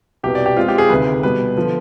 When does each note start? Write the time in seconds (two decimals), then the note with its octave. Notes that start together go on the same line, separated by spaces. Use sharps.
0.23 C2 B2 B3 G4
0.35 D5
0.46 G4
0.57 B2 G#3 C4 F4
0.68 G4
0.78 G#4
0.90 D2 C3 D#3 B4
1.23 B2 G3 B3 B4
1.56 D3 F3 B3